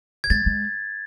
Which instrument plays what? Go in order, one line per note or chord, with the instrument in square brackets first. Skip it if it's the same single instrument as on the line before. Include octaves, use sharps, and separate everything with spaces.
[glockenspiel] G#6
[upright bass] G#3 [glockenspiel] A6
[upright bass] G#3